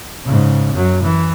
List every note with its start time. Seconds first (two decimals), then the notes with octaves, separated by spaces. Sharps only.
0.25 G#2 C#3
0.73 F#2 F#3
1.03 E3